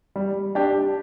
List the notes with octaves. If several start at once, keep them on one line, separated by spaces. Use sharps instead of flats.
G3
D4 G4